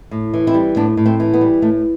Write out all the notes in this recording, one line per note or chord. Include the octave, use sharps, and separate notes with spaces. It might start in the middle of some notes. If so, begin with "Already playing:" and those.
A2
E3
C4 E4
G3
A2 B3 D4
A2
A3 C4
E3
B3
G3
A2 A3